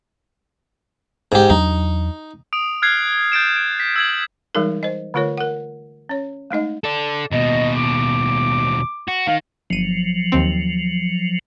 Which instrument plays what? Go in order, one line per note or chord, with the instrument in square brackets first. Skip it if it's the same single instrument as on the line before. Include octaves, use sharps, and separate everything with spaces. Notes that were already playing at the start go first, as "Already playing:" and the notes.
[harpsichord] G#2 G4
[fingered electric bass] E2 F#3 D4 [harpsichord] D#4
[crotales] D#6 D7 F7
F6 F#6 G#6 C7
G6 A6 D7 E7
D7
B6
E6 G#6 F#7
[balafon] E3 G3 G#3 D#4 G#4 A#4
C5 D#5
D3 A3 F4 A#4 C#5
A#4 F#5
C#4 C#5
G#3 A3 D#4 D#5
[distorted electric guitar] A4 D5
[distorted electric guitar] D#2 B2 [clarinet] D#5
[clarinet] D6
[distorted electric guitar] F#4
[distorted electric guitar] D#3 [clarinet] F5
[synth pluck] G1 D#7 [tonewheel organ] F3 F#3
[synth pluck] D#2 C4